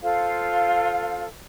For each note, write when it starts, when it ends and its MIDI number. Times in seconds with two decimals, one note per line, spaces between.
0.01 1.25 65
0.01 1.25 69
0.01 1.25 72
0.01 1.25 77